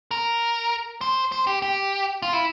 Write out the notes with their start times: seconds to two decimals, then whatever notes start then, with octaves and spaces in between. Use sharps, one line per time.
0.11 A#4
1.01 C5
1.32 C5
1.47 G4
1.62 G4
2.22 F4
2.33 E4